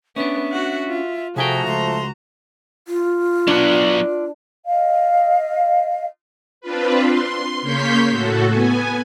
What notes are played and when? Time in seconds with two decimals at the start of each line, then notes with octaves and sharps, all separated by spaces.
0.16 B3 C#4 D4 E5
0.52 F#4 F#5
0.88 F4
1.36 C3 F3 A3 E4 F#4 G#4 G5 A#5
1.67 C#2 C6
2.87 F4
3.47 F#3 B3 D4
4.66 D#5 F5
6.61 C4 D4 F4 B4
7.04 C6
7.62 C#3 A#3 C#5 C6 G6 B6
8.09 A2 F#4 A4
8.49 B3 G#5